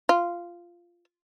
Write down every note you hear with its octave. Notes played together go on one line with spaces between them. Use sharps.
F4